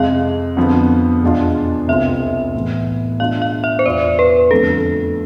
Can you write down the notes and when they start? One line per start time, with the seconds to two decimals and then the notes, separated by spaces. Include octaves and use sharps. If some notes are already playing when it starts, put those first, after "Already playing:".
Already playing: F2 C3 G#3 F5
0.57 F2 D3 F3 B3
1.23 E2 B2 G#3 D4 F4
1.88 C2 B2 G#3 C4 F4 E5
2.54 A2 E3 B3
3.20 B2 G#3 D4 F4 F5
3.42 F5
3.64 E5
3.79 C5
3.86 E2 B2 B3 F4 D5
4.19 B4
4.51 F2 D3 F3 A3 A4